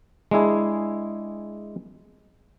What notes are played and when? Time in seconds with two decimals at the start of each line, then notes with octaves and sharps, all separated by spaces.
0.31 G#3 D4 E4 G#4